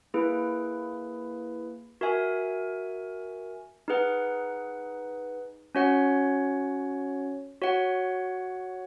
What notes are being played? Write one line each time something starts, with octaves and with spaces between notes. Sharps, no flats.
A#3 E4 G#4 B4
F#4 A#4 E5 G#5
D#4 G#4 B4 F#5
C#4 F#4 C#5 F#5
F#4 C#5 F#5